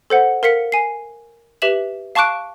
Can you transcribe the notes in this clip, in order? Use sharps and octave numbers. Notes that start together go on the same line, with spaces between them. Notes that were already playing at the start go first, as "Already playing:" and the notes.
A4 C5 F#5
A#4 F5 B6 C#7
G#5 C7
G4 B4 E5 E7 F#7
F5 A5 C#6 D6 F#6 D7